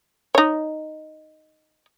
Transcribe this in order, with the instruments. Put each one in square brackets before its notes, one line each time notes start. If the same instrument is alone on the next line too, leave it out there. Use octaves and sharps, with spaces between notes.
[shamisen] D#4 C#5